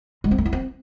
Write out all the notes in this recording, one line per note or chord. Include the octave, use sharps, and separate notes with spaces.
G#3
C4
A3
E4
C4